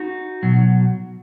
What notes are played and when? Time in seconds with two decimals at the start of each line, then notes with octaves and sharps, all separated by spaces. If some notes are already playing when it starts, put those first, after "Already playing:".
Already playing: D#4 F#4
0.43 B2 F#3